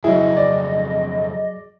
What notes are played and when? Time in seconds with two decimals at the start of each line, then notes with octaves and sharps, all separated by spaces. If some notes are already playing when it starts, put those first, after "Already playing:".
0.04 F2 C#3 F#3 E4 G#4 D#5
0.37 D5